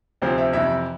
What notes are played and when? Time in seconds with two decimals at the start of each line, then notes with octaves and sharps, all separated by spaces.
0.22 D2 C3 F3 C4 C5
0.38 E5
0.53 F2 C3 E3 E5